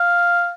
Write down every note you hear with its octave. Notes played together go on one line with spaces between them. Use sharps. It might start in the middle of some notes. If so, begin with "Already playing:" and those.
Already playing: F5